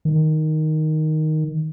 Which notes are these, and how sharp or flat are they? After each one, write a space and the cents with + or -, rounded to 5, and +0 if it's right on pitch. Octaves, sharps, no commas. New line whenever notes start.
D#3 +0